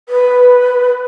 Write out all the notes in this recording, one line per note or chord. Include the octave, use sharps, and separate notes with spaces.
B4